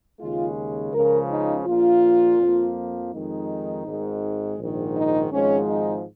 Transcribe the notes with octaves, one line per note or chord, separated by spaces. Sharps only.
D#2 C#3 G#3 F4
C#2 C#3 F3 A#4
D#4
A#1 A#2 A#3 F4
F2 F3 A#3
F2 D#3 G#3 D#4
G#1 G#2 D#3 G#3
A#1 G#2 D#3
D#4
G#1 G#2 F3 G#3 C#4
D#4